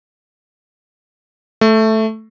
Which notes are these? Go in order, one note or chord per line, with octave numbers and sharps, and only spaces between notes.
A3